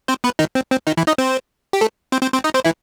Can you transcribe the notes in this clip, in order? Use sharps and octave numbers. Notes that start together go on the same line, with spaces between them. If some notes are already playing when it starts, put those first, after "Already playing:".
C4 C5
B3 B4
D#3 D#4
C4
C4
D#3 D#4
E3 E4
D#4 D#5
C4 C5
G4
A3 A4
C4 C5
C4 C5
C4 C5
D#4 D#5
C4 C5
E3 E4